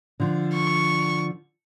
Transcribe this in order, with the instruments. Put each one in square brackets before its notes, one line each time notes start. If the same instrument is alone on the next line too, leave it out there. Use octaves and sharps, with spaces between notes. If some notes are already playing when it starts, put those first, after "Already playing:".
[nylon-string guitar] D3 F3
[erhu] C#6